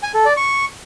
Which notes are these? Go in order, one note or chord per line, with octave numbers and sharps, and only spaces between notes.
G#5
A4
D5
C#6